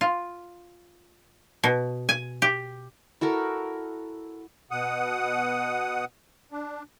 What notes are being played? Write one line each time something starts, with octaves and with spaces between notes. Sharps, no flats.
F4
B2
G#5
G4
E4 F#4 A4 A#4
B2 F#5 D#6
D4